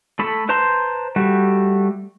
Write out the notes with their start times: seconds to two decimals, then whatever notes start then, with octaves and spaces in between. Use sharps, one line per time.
0.19 A3 A4 B5
0.49 B4 C5 A5 A#5 C6
1.16 G3 A3 F#4